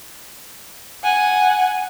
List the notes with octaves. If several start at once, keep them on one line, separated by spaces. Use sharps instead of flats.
F#5 G#5